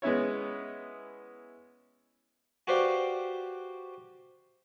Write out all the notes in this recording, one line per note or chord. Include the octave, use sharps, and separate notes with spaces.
G#3 B3 C#4 E4 C#5
F#4 G4 B4 C5 D5 F5